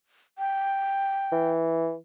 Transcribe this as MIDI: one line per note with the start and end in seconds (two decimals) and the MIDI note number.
0.38 1.50 79
1.32 1.95 52